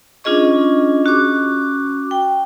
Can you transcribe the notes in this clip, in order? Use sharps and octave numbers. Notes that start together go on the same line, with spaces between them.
C#4 D4 F4 G#4 D#5 C#6
C#4 F#4 C#6 D6
G5